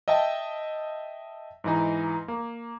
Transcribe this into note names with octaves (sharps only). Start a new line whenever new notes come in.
D#5 E5 G5 A5
G#2 E3 D#4
A#3